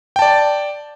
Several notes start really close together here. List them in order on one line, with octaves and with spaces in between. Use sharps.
G5 A5 D5